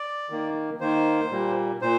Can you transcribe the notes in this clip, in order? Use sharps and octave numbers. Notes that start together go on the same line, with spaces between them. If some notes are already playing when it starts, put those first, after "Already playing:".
Already playing: D5
D#3 A#3
D#3 A#3 C5
A#2 G3 A#3
A#2 C5